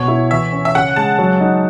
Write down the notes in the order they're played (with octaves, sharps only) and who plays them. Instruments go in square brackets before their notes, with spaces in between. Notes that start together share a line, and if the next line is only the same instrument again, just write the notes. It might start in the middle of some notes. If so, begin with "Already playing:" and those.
Already playing: [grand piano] B2 [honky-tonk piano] C#5
[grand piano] E4
[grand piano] E3 [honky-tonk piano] E5
[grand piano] C#4
[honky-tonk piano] E5
[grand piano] C#3 [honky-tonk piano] F#5
[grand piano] G#3 [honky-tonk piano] A5
[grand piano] F#3
D#4